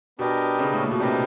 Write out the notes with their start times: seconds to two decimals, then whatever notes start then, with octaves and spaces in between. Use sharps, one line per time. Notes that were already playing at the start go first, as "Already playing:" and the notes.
0.19 B2 B3 D4 G4 A#4 D#5
0.59 C#3
0.73 A2
0.83 A#2
0.91 B2
1.00 C3 B3 D4 G4 A#4 D#5